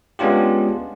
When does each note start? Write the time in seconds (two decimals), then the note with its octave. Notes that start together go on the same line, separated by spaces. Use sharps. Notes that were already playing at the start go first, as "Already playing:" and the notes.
0.19 G#3 B3 C#4 D4 F4 G4